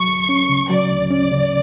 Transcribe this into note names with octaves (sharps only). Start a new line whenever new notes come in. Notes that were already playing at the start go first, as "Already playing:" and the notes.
Already playing: F#3 C#6
D2
C#4
C#3
F#3 D5
D2
C#4 D5
C#3